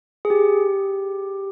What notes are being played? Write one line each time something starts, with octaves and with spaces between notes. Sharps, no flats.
G#4
G4